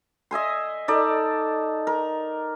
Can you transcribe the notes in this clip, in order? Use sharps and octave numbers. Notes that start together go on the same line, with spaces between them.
D#5 E5 G#5 C6
D#4 A4 D5
A#4